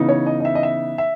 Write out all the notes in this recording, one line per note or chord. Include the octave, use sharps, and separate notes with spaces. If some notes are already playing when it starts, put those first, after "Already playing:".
Already playing: C#3 E3 B3 D#4
C#5
D#5
D#5
E5
D#5
E5
E5